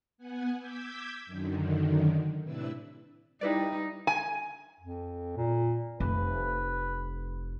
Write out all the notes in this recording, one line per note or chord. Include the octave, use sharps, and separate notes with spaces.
B3 F#5 G#5
D6 E6 G6 G#6 B6
F#2 D3 D#3
A2 C3 D4 E4 B4 E6
G3 D#4 E4 B4 D5
G#5
F2
A#2
F1 B4